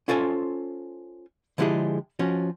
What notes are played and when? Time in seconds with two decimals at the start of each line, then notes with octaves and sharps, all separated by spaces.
0.08 C#4 F4 A4 C5 G#5
1.58 D3 F3 G#3 E4 G4 G#4
2.19 F3 C#4 F#4